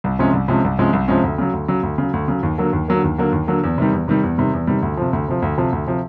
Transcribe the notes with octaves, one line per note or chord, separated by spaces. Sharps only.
C2
C3 F3 G#3 C#4
C2
C3 F3 G#3 C#4
C2
C3 F3 G#3 C#4
C2
C3 F3 G#3 C#4
D2
C#3 F#3
D2
C#3 F#3
D2
C#3 F#3
D2
C#3 F#3
D#2
D3 F#3 A#3
D#2
D3 F#3 A#3
D#2
D3 F#3 A#3
D#2
D3 F#3 A#3
E2
C3 D#3 G3
E2
C3 D#3 G3
E2
C3 D#3 G3
E2
C3 D#3 G3
D2
C3 F3
D2
C3 F3
D2
C3 F3
D2
C3 F3